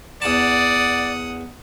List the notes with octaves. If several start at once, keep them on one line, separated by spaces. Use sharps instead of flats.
E2 D5 F#5 A5 D#6